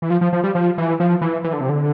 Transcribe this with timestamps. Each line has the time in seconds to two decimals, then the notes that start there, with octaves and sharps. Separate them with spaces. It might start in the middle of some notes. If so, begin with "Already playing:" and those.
0.02 E3
0.10 F3
0.21 F3
0.33 F3
0.44 G3
0.55 F3
0.78 E3
1.00 F3
1.21 E3
1.44 E3
1.53 D3
1.61 C3
1.69 D3